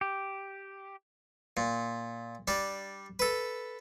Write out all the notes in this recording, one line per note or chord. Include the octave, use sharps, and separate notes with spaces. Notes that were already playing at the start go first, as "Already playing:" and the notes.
G4
A#2
G3 D4
A4 B4